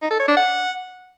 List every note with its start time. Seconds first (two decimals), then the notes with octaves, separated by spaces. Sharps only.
0.02 D#4
0.11 A4
0.19 C#5
0.28 D4
0.37 F#5